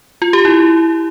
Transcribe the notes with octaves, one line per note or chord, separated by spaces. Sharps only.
F4
G4
E4